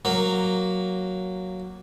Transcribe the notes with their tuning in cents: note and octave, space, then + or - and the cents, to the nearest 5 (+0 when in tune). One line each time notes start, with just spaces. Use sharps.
F#3 +0 A#3 +0